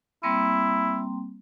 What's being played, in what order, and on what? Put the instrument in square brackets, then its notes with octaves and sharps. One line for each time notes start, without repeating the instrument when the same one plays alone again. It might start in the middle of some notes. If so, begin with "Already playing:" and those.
[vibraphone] G3 A#3 C4 [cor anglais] E4